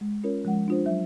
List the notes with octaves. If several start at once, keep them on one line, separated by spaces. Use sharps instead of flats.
G#3
C#4 F4 A#4 C#5
F3 G#3 F#5
D4 F4 C5
F#3 E5